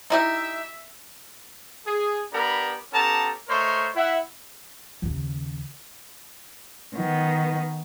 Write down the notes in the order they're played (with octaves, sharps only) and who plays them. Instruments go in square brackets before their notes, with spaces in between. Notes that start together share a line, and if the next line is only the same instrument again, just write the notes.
[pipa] D#4 E4 G4 [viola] E5
[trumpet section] G#4
B3 D4 G4 A#4 B5
B3 C#4 G4 A4 A5 A#5
A3 A#4 C5 C#5 D#5 C6
E4 E5 F#5
[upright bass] D#2 C#3
[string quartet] D#3 B3